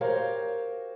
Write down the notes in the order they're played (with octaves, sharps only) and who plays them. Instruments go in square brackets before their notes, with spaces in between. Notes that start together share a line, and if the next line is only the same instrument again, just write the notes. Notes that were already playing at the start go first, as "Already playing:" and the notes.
[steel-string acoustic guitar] F#4 G4 A#4 C5 C#5 F5